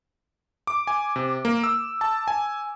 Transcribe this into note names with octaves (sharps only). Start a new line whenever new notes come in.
D6
G#5
C3
A#3
E6
A5
G#5